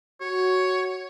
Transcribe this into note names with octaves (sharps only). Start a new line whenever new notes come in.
F#4 C#5